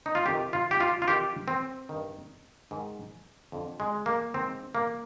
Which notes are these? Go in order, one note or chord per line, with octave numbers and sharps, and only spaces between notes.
D#4
F4
F2 C3 D#3 G4
F4
G4
F4
F4
F2 C3 D#3 G4
C4
G2 D#3
G#2 D#3
F2 D3
G#3
A#3
G#2 D#3 C4
A#3